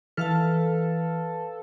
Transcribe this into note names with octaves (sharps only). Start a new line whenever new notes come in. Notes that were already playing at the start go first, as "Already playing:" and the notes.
E3 A4 B4 F5 A5 F6